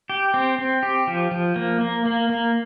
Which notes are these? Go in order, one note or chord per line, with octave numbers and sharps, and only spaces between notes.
G4
C4
C4
G4
F3
F3
A#3
A#3
A#3
A#3